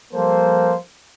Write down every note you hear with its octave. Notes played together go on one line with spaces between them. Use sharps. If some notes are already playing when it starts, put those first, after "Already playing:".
F3 G3 A#3 A4 C5